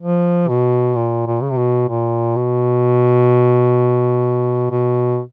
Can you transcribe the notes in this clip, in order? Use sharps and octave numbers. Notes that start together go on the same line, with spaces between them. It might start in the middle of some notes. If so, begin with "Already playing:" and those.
F3
B2
A#2
A#2
C#3
C3
B2
A#2
B2
B2